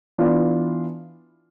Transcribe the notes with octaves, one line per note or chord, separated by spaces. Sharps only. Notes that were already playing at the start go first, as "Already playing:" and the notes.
E3 B3 D4 F4